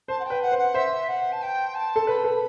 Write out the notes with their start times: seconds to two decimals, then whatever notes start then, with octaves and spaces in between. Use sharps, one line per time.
0.08 C5 A5
0.19 F#5
0.24 G5
0.30 B4
0.41 F#5
0.52 C5
0.58 F#5
0.74 C5 E5
1.08 F#5
1.31 A5
1.41 G5
1.74 A5
1.96 A4
2.07 B4 B5
2.24 A4